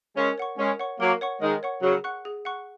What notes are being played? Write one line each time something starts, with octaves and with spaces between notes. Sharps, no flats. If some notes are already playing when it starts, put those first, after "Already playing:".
G#3 C#4 A#4
C#5 F#5 C#6
G#3 C#4 A#4
C#5 F#5 C#6
F#3 A#3 A#4
C#5 F#5 C#6
D#3 G#3 A#4
C#5 F#5 C#6
C#3 F#3 G#4
F#5 C#6 F#6
G#4
F#5 C#6 F#6